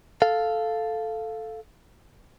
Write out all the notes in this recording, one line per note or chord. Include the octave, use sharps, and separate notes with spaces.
A4 F5